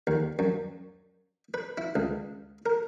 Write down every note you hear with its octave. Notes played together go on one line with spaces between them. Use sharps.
D#2
F#2
B4
E4
C#2
A#4